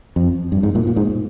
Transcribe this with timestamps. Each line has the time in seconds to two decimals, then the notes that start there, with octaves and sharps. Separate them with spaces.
0.16 F2
0.52 G2
0.63 G#2
0.75 A#2
0.87 A#2
0.96 G#2